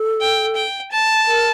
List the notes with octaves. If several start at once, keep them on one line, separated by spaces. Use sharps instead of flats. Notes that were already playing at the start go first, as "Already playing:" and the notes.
Already playing: A4
G5
G5
A5
A#4